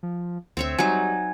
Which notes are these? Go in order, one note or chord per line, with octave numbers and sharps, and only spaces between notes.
F3
D2 C4 C#5 E5
F#3 G3 D#4 G#5 G#6